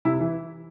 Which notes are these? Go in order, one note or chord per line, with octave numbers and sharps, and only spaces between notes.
C3 E4
E3 E4